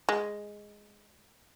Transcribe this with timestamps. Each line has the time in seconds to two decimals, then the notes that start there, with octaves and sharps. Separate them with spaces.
0.09 G#3